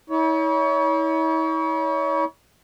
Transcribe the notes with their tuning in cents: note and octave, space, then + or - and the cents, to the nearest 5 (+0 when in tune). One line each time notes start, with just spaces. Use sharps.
E4 -45 C#5 +25